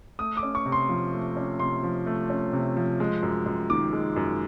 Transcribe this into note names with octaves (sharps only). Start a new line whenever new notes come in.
A3 D#6
D6
C#4
C#6
C3
C6
F3
A3
C#4
C3 C6
F3
A3
C#4
C3
F3
G#3
F#2
F#2
D#3 D6
G#3
F#2